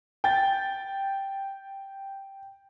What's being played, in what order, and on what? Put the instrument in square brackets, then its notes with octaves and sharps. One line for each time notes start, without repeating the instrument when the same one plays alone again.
[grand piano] G5 A6